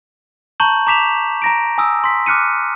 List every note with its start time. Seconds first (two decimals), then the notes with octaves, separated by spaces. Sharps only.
0.60 A5 A#5 C#6 G6 F#7
0.87 A#5 D6 B6 E7 F7
1.42 A#5 A#6 D7
1.78 G#5 D#6 E6
2.04 C6 B6
2.26 D6 F6 F#6 C#7 D#7